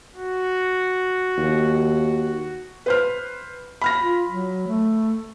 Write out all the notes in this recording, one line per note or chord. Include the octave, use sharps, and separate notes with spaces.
F#4
D#2
B4 C5 F6
B5 F6 A#6
F4
F#3
A3